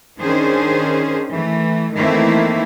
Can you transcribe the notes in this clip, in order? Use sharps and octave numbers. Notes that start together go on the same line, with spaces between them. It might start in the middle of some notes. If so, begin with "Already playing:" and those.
D#3 C#4 D4 G#4 C5
E3 A3
D#3 E3 A3 A#3 C4 E4